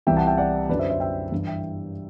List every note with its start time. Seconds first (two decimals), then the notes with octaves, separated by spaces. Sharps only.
0.07 C2 C3 E3 E5 G5
0.17 F#5 A5
0.27 E5 G5
0.38 D5 F#5
0.69 F#2 D3 B4 D5
0.79 C5 E5
0.90 C5 E5
1.00 E5 G5
1.32 G2 E3
1.47 E5 G5